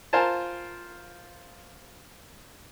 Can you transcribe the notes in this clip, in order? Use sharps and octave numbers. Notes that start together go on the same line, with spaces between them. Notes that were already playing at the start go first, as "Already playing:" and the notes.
F4 A#4 C5 G#5 A5